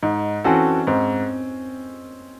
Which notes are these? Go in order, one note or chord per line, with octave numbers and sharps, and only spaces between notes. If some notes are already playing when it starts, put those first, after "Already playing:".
G#2 D#4
E3 C4 C#4 F#4 A4
G#2 C4